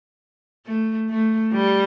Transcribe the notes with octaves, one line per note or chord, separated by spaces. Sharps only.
A3
A3
G3